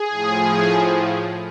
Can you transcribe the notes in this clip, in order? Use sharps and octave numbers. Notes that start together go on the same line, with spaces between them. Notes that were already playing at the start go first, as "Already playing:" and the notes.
Already playing: G#4
A2 F3
G#4